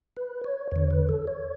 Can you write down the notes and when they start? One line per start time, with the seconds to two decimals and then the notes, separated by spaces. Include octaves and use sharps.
0.17 B4
0.44 C#5
0.71 E2 D3 C#5
0.91 B4
1.09 A4
1.27 C#5